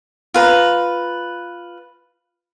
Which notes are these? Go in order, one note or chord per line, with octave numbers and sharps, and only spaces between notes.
F4 B4 A#5